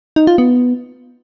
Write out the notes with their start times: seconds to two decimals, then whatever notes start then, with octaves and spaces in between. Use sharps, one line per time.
0.16 D#4
0.27 F4
0.38 B3